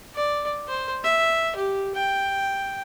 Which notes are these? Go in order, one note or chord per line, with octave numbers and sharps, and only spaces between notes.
D5
C5
E5
G4
G5